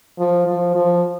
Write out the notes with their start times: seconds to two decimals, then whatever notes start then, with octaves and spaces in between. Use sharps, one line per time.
0.18 F3
0.47 F3
0.75 F3